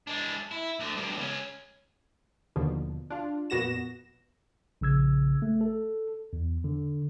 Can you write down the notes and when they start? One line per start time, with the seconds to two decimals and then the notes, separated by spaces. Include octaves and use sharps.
0.07 G#3 D4
0.51 E4
0.80 D2 D3
0.96 G2 B2
1.17 C#2 C#4
2.56 D#2 B2 D3 F3
3.10 D4 F4
3.50 F2 A#2 B3 F#4 A#6 E7
4.81 A#1 C#3 E6 G#6
5.42 A3
5.61 A4
6.33 E2
6.64 D3